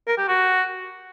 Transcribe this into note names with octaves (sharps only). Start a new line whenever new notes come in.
A#4
G4
F#4